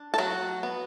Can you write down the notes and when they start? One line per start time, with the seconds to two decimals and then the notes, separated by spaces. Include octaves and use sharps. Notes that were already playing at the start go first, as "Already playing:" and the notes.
Already playing: D4
0.14 A4
0.18 F#3 F#4
0.63 B3